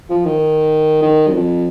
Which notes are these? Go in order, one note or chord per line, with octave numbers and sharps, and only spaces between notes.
F3
D#3
D#3
F#2
F2